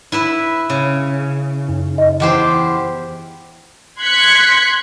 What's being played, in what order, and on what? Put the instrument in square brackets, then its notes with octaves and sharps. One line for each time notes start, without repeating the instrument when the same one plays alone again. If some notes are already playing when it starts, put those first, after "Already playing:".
[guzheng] E4 B4 E5
C#3
[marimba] F#2
D#5
[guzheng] E2 G4 C5
[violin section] C6 F#6 G#6 B6 C#7